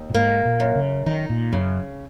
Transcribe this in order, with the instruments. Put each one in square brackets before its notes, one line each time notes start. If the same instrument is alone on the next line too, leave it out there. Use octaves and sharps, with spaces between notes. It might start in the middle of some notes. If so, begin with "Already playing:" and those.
Already playing: [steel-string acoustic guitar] D#2
[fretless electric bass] A#2
[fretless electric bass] G#2 [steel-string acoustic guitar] A#3
[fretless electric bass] A#2
[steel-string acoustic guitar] F#2
[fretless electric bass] C#3
[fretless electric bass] D#3 [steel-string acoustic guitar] D#4
[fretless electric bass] A#2
[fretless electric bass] F#2 [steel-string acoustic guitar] C#3